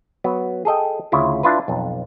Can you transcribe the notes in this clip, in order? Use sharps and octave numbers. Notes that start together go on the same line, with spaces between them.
F#3 B3
G#4 A4 D#5 G5
D2 C#3 E4 F4
D4 E4 F4 B4
B1 F2